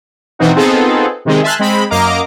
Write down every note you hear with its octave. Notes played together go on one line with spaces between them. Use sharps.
B2 D#3 E3 C4 D#4 F#4
B3 C4 D#4 F4 G#4 A4
C3 D#3 G#3 C4
E5 G#5 A5 C6 F6 F#6
G#3 C4 B5
F#2 A#3 D#5 F5 A#5 D6